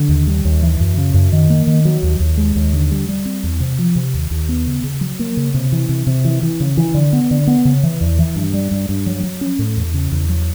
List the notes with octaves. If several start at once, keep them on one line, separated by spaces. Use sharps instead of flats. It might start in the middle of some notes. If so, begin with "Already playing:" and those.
Already playing: D3
D#2
G3
D#2
E3
F#2
C#3
F#2
D#3
A#3
D#3
F#3
D#2
D#2
G#3
D#2
D3
G3
G3
C4
E2
C3
F3
C3
D#2
D#2
B3
C#3
C#3
F#3
A#3
C#3
C3
E3
C3
C3
E3
E3
C#3
E3
D3
B3
D3
B3
C#3
E3
E2
E3
G2
G3
G2
G2
F#3
F#3
C#4
A2
E2
C#3
E2
F#3